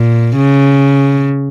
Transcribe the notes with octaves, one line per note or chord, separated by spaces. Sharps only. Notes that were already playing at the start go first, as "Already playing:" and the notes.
Already playing: A#2
C#3